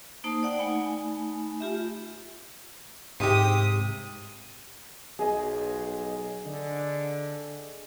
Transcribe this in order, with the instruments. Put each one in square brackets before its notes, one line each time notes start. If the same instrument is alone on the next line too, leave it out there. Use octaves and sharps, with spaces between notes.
[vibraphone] A#3 D#4 C5 A5 D#6
D5 F#5 G5
A3 D#4 G#5 B5
F4 G4 E5
[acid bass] G#2 [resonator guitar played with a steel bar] C3 G4 [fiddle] D#6
[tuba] B1 [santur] G#4 D#5
[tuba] D3